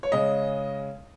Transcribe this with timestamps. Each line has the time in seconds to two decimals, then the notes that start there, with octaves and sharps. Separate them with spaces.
0.03 C#5
0.12 C#3 G#3 C#4 D#5